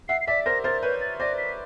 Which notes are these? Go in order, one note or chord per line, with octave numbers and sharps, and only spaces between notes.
E5 F#5 C7
C7
D5 E5 B6
A#4 C5 A#6
A#4 C5 A6
B4 C#5 G6
A6
C5 D5 A#6
B6